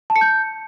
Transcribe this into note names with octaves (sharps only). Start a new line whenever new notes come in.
A5
C#7
G6